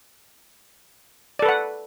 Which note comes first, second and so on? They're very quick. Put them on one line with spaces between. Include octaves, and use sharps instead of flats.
D5 A4 B4 F#5